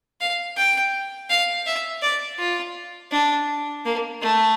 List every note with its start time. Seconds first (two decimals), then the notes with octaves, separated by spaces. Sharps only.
0.21 F5
0.57 G5
1.30 F5
1.66 E5
2.03 D5
2.39 F4
3.12 D4
3.85 A#3
4.22 A3